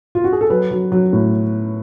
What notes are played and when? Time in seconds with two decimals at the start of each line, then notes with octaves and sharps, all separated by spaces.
0.15 F4
0.24 F#4
0.32 G#4
0.41 A4
0.50 F#3 B4
0.71 F#3
0.92 F#3
1.13 A2